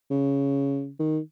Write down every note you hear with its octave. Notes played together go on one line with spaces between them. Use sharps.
C#3
D#3